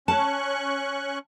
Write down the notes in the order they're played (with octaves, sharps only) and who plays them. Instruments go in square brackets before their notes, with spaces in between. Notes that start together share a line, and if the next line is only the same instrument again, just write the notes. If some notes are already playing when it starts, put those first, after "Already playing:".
[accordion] C#4 C#6 F#6 [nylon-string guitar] A5